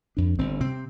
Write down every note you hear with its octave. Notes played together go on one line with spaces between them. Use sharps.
F2 D4
G1 C4
C3 C4